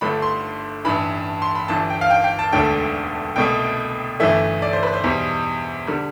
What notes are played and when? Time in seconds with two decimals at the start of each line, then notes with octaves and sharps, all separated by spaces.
0.01 G1 G2 D3 A3 B5
0.22 C6
0.85 A1 G2 E3 B5
1.42 C6
1.55 B5
1.68 G1 G2 E3 A5
1.90 G5
2.01 F5
2.10 G5
2.24 G5
2.39 A5
2.52 E1 D2 D3 A3 G5
3.36 C2 B2 A3 G5
4.20 G1 G2 E3 A3 E5
4.62 D5
4.73 C5
4.83 B4
4.93 C5
5.04 E2 B2 G3
5.87 D3 G3